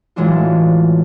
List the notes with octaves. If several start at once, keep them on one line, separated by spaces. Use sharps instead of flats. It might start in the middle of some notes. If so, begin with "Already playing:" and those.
A2 E3 F#3 G#3 D4 F4